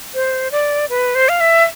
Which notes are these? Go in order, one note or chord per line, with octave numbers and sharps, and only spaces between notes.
C5
D5
B4
C5
F5
E5